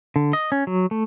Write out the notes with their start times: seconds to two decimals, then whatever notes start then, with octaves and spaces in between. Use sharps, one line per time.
0.16 D3
0.33 D#5
0.52 C#4
0.67 F#3
0.91 A3